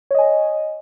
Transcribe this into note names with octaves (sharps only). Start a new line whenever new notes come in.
C#5 D#5 G#5